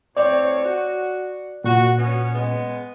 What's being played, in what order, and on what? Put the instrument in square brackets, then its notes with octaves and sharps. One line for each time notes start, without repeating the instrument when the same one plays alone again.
[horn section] A2 C4 C#5 [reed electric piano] D5
[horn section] F#4
[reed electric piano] A#2 [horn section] F#4
[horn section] B3 C#4
G#3 B3